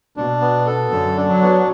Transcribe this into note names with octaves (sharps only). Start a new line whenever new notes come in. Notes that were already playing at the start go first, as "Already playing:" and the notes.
B2 D4
B3
A4
F#2 D3
D4
F#3
B3